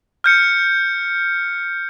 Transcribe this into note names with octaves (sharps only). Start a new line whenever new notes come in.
F6 G6 C#7